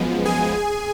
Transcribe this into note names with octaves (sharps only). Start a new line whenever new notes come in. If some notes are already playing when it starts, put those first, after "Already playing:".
Already playing: F#2 F3 G#3 B3
G#4 G#5